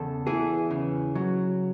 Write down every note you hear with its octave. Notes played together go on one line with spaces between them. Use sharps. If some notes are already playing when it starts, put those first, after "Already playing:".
Already playing: E2 C#3 A4
E3 G#4
C#3
F#3